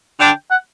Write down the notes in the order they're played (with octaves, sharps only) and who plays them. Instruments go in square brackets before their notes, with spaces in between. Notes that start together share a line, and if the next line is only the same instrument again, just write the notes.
[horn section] D3 D4 [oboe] G5
[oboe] F#5